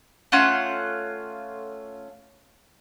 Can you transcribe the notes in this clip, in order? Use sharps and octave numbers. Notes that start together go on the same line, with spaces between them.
A3 C#4 F4 F#5